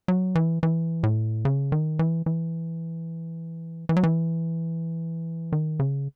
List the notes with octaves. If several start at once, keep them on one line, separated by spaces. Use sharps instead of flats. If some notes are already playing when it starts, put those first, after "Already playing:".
F#3
E3
E3
A2
C#3
D#3
E3
E3
E3
F#3
E3
D#3
C#3